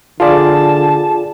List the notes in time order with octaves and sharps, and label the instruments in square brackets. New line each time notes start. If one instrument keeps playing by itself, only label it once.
[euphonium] D3 [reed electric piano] F4 G#4 D5 [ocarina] A5